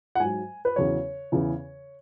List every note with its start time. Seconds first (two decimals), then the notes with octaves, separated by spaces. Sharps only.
0.15 F#5
0.20 G#2 F#3 G#5
0.65 B4
0.76 E2 C#3 F#3 C#5
1.32 E2 C#3 E3